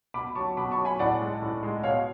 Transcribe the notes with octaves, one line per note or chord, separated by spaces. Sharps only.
B2 B5 D6
F#3 A5 C#6
B2 B5 D6
A5 C#6
F#3
G#5 B5
A2 D5 F#5
G#3
A2
G#3
B2 C#5 F5